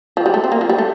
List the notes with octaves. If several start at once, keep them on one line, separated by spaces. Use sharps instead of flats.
F3
G3
A3
C4
A#3
F3
G3
A3